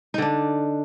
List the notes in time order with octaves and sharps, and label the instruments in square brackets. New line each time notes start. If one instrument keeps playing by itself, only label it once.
[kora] D#4
D3
D4